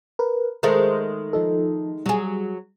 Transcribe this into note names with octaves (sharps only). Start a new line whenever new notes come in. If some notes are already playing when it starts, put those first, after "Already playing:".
A#4 B4
D#3 G#3 A3 A#4 C5
F3 D#4 A4
F#3 G3 G#4